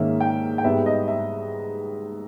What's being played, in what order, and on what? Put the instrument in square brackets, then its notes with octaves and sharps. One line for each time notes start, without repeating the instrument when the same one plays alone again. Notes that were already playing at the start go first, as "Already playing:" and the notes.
Already playing: [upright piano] G#2 D#3 A#3 C#4 E5
G5
G5
G#2 G3 B3 E5
D#5
E5